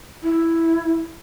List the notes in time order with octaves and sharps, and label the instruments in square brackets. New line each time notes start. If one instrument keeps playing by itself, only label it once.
[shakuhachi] E4